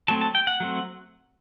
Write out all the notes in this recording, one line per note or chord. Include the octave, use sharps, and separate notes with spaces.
F#3 A3 C4 A5
A5
G5
F#5
F#3 A3 C4